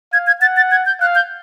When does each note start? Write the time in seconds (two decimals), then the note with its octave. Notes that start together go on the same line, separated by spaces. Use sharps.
0.13 F5 G#6
0.27 G#6
0.42 F#5 A6
0.57 A6
0.71 G#6
0.86 G6
1.01 F5 F#6
1.15 G6